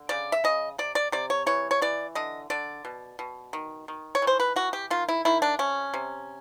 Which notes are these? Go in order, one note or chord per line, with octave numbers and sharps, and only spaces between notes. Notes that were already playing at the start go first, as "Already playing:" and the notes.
Already playing: D3
C#3 D5
E5
C#3 D#5
C3 D5
D5
C3 D5
C#5
E3 C#5
C#5
E3 D5
D3 D#5
D3 D5
B2
B2
D#3
D#3
C#5
E3
C5
B4
E3 F#4
G4
D#3 F4
E4
D#3 E4
D4
C3 C#4
C3